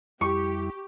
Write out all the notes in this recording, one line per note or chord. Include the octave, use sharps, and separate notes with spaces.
F2 G3 E4 G4 C#6